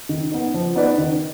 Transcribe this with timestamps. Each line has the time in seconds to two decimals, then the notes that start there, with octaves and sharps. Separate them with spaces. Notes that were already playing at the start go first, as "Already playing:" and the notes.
0.09 D#3
0.31 B3 D#4
0.54 F3
0.76 B3 D#4 B4 D5
0.98 D#3